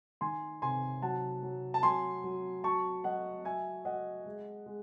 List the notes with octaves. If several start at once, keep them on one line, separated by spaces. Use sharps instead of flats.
D#3 G#5 C6
C3 G#5 C6
F#3 F#5 A5
F#3
A5
F#3 G#5 C6
F#3
F#3 A5 C#6
F#3 D#5 F#5
F#3 E5 G#5
F#3 D#5 F#5
G#3
G#3